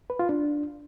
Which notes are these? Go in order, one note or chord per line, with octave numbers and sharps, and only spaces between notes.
B4
F4
D4